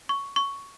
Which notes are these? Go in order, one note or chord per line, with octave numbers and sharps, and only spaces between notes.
C#6
C#6